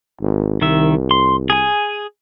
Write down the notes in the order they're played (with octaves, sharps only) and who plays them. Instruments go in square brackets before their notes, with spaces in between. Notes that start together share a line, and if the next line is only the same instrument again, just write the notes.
[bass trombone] G#1
[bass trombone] C2 [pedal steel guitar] D#3 E5
[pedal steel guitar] C6
G#4 G#5